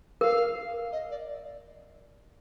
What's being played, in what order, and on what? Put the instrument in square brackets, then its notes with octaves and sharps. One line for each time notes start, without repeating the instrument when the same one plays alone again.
[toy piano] A#4 [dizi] F5
[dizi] D#5
D5